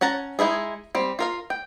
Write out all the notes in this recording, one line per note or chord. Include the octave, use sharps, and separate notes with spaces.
C#4 F#5 A5 A#5
G#3 A#3 D#4 E4 G#4
G3 C4
F4 A#4 F5
G5